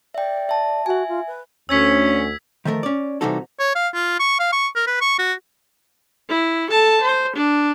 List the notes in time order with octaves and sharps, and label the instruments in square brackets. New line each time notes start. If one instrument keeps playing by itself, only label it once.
[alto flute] D5 [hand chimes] E5 G5
[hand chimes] E5 A5
[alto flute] F#4 [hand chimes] E5 G#5
[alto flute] F4
B4
[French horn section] D2 [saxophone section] C#4 [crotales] E6 G#6 B6
[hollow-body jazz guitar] D#3 F3 A3 A#4
C#4 D5
C3 E3 G3 D#4 F#4 A4
[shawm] C#5
F5
F4
C#6
F5
C#6
A#4
B4
C#6
F#4
[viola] E4
A4 A5
C5
D4